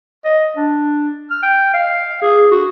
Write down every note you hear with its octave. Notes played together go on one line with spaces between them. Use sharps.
D#5
D4
F6
G5
F5
G#4
F#4